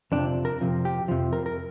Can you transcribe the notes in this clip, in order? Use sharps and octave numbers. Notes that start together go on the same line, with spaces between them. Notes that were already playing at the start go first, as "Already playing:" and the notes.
F2 C3 F3 D4
A#4
F2 C3 F3
G4
F2 C3 F3
A#4
A#4